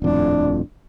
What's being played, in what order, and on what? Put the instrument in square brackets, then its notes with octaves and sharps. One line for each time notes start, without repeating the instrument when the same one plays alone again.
[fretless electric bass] D#1 F2 A2 [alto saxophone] D4